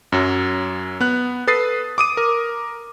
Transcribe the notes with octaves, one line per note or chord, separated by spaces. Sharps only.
F#2 F#3
B3 F#6
A4 B4 D#6 A6 C7
D6 D#6 D#7
A#4